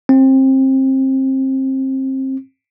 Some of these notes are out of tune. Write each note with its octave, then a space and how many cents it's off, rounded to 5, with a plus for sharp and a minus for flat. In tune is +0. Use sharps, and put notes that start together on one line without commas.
C4 +25